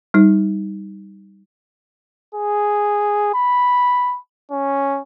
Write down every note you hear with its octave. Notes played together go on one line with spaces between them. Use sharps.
G3 D#4
G#4
B5
C#4